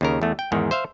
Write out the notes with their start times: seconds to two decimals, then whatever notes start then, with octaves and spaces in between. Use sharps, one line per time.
0.01 D#2 C#3 A#4
0.22 E2 A3
0.39 G5
0.52 E2 G#2 D#3
0.71 C5 E5 F5